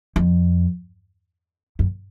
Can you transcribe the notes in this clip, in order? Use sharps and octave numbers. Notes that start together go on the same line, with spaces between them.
F2
F#2